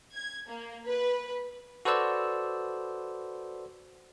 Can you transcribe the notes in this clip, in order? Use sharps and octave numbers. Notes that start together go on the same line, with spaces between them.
G#6
A#3
B4
F#4 A4 B4 C5 D5 E6